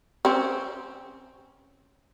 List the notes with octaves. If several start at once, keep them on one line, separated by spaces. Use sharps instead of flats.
C4 C#4